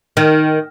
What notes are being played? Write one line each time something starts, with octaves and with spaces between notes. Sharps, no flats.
D#3